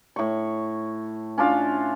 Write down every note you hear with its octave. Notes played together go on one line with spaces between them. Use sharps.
A2 C#6
C#4 D4 F4 F5